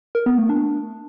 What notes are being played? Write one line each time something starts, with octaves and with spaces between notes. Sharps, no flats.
A#4
B3
A3
D4